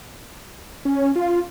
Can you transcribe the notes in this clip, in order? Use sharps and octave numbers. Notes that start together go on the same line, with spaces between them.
C#4
F4